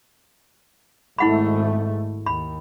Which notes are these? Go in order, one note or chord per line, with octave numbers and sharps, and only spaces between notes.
G#1 G#2 A3 E4 F#5 B5
D#2 B5